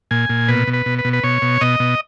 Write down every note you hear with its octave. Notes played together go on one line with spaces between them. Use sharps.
A#2 G#5
A#2
B2 B4
B2
B4
B2
B4
B2
B4
B2 C#5
B2
B2 D#5
B2